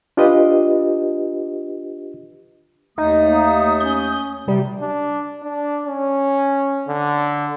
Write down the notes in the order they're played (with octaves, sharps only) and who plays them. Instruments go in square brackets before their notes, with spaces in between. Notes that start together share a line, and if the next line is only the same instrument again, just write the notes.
[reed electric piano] D4 F4 G4 B4 D#5
[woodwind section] D#2 A3 D#6 [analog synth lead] D#4
[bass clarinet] A#3
[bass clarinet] C#4 [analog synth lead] G6
[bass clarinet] C3 [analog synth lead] G3
[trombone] D4
D4
C#4
D3